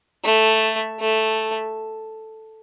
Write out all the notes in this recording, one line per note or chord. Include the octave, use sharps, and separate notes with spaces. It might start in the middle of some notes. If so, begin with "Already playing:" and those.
A3
A3